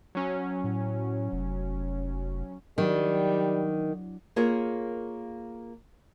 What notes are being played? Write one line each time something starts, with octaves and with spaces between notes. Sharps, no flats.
F#3 C#4
A2
F1
D#3 F#3 G3 D4
A#3 F4 G#4 A#4 C#5